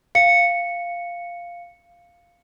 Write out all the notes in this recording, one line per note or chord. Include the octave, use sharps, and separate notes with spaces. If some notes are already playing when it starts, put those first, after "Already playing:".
F5 C#7